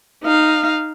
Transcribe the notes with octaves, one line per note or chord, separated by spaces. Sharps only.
D#4 F5